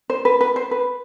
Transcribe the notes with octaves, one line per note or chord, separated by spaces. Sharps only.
C5
B4
B4
C5
B4